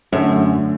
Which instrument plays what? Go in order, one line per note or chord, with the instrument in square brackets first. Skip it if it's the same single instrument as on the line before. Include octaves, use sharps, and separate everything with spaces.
[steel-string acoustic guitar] F#2 [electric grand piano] D3 A3